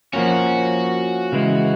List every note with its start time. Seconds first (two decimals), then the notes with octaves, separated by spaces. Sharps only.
0.13 F3 A#3 C#4 F#4
1.32 C#3 E3 G#3